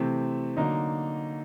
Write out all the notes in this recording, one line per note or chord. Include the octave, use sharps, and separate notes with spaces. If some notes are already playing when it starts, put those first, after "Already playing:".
Already playing: C3 E3 A3 C4
D3 F#3 A#3 D#4